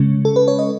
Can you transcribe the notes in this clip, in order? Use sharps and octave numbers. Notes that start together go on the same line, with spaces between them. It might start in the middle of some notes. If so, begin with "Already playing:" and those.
Already playing: C#3 G#3 C#4
A4
B4
C#5
D#5